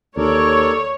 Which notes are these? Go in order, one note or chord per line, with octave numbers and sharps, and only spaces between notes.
D#2 A4 A#4 C#5 D5